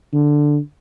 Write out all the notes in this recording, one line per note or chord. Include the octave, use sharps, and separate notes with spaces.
D3